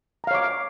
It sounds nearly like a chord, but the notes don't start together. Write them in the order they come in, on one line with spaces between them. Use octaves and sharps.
A#5 F5 C#5 D6